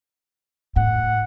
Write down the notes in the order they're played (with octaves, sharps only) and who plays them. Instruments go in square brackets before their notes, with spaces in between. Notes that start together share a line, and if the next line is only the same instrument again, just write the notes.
[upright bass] A2 [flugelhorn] F#5